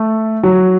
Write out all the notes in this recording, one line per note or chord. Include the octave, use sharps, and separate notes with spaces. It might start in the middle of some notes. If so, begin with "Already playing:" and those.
Already playing: A3
F#3